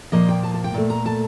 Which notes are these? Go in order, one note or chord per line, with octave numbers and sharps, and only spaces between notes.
A#2 F3 A#3 D#5
G5
A5
A5
G5
A#2 A3
A#5
A5